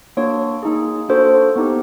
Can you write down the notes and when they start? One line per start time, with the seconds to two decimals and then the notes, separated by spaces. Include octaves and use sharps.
0.17 A#3 D4 F#4 C#5
0.63 A#3 D#4 G#4
1.09 A#3 D4 F#4 A4 C5
1.56 B3 D#4 G4